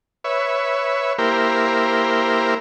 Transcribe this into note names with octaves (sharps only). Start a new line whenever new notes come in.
B4 C#5 E5
A#3 E4 G4 A#4 C5